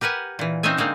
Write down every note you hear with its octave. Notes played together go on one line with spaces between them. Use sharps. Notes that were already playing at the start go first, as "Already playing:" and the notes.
G4 A#4 B4 F#5 G#5
A#2 E3
C4 C#4 D#4 D#5 E5 G#5
D3 G#3 A#3 C4 D#4